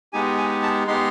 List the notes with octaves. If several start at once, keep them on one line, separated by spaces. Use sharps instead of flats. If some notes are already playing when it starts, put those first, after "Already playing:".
G#3 B3 D#4 G4 G#5
G#5
A5
G#3 B3 D#4 G4 C6